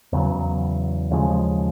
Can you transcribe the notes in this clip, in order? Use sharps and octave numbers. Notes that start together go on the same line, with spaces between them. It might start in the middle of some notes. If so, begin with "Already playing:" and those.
E2 C#3 F#3
D#2 C#3 F3 G#3